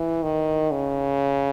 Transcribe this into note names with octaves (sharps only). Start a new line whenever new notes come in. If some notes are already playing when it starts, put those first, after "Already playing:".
Already playing: E3
D#3
C#3